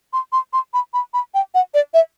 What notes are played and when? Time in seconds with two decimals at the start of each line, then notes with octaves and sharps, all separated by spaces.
0.13 C6
0.33 C6
0.53 C6
0.74 B5
0.94 B5
1.14 B5
1.34 G5
1.54 F#5
1.74 D5
1.94 E5